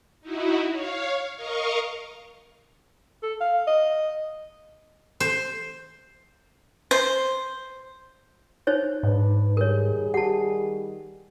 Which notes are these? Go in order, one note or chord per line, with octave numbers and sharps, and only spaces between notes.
D#4 E4 F#4
C#5 F5
A#4 D#5 F5 C#6
A4
F5
D#5
C5
C5
D#4 C5 C#5
G#2 D4 B4
D#3 G3 G#4 A#4 C#5
G4 F#5 A5